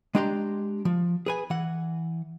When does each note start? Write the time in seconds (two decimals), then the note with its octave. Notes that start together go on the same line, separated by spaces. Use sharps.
0.15 G#3 D4 G4 A#5 C6
0.85 F3
1.26 G#4 B4 G#5
1.50 E3 F#5